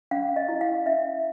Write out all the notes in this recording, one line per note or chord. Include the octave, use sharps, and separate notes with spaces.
C#4 F5
D#5
E4
F5
C#4 E5